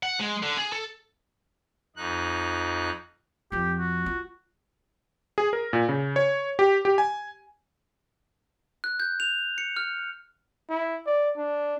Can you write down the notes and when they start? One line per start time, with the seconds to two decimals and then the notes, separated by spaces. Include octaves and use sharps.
0.03 F#5
0.20 G#3
0.43 D3
0.57 G#4
0.72 A4
1.96 F2 D#4 F#6
3.52 F2 F3 G4
3.78 F#4
4.06 F4
5.38 G#4
5.53 A#4
5.73 A#2
5.89 C#3
6.16 C#5
6.59 G4
6.85 G4
6.98 G#5
8.84 F#6
9.00 G6
9.20 F7
9.58 C#7
9.77 F6
10.70 E4
11.06 D5
11.37 D4